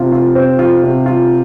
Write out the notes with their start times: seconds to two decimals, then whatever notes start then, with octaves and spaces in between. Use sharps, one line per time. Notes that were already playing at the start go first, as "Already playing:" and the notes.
Already playing: C3 F4
0.12 F4
0.35 C4
0.59 F4
0.83 C3
1.06 F4